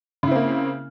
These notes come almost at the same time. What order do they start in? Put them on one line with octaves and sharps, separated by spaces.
C#3 E4 C4 A#3